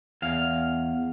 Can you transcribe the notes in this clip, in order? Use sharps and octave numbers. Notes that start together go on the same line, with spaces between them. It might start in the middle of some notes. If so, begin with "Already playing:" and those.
E2 F5